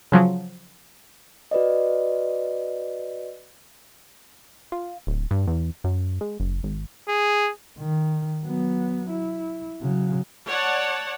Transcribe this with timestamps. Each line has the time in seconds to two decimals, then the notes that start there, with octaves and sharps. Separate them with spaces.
0.12 C#3 F3 F#3
1.51 F#4 B4 D5 D#5
4.72 F4
5.07 D1
5.31 G2
5.47 E2
5.84 F#2
6.21 G#3
6.40 F#1
6.63 G#1
7.09 G#4
7.79 D#3
8.44 F#3 B3
9.11 E4
9.82 C#3 F#3
10.47 C#5 D5 F#5 A5